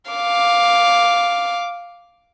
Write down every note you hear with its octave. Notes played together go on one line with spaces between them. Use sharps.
F5 D6